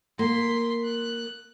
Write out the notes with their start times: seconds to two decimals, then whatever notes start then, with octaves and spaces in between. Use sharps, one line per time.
0.19 A#3 C6 B6
0.84 F#6